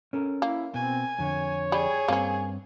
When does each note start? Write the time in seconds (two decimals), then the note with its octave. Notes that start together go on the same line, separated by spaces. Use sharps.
0.13 C#4 A4 A#4
0.42 A#3 E4
0.74 B2 C4 G#5
1.18 F2 D3 C#5
1.72 G3 G#4
2.08 G2 A#3 C4 C#4